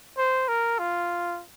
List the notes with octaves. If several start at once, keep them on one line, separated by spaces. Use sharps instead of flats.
C5
A#4
F4